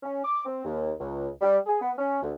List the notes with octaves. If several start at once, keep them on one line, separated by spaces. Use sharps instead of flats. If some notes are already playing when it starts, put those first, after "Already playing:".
C#4
D6
C4
D#2
C#2
G3
G#4
B3
C#4
D2